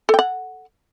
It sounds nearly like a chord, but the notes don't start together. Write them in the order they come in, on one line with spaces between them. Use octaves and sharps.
A4 G5 F#5